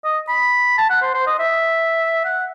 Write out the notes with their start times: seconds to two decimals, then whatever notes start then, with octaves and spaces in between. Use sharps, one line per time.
0.04 D#5
0.28 B5
0.78 A5
0.90 F#5
1.02 C5
1.14 C5
1.27 D#5
1.39 E5
2.25 F#5